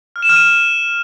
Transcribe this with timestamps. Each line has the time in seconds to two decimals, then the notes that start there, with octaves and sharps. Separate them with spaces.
0.16 F6
0.22 E7
0.29 F6
0.36 D#7